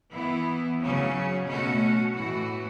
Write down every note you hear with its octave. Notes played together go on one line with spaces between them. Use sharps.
E3 B3 E4
C#3 F#3 C#4
B2 A3 C#4 F#4
A2 E3 A3 F#4